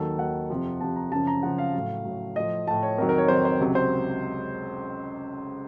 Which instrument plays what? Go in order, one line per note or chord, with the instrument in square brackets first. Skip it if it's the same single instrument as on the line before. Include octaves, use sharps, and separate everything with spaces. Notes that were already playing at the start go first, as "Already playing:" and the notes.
Already playing: [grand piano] D#2 D#3 F#3 A4
D#2 D#3 F#3 F#5
F2 C3 F3
F2 C3 F3 A5
A#5
F#2 C#3 F3 A5
A#5
F#2 C#3 F3 F#5
F5
A2 F#3
A2 F#3
A2 F3 D#5
A2 F3 A5
C#5
F2 D#3 F#3 A#4
A#4
C#5
F2 D#3 F#3 C5
C5
C#2 C3 F#3
C5